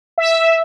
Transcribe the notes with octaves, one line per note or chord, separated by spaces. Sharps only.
E5